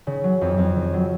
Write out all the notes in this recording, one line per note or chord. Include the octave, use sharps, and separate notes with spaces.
C#3
F#3
F2
F2
C#3
F#3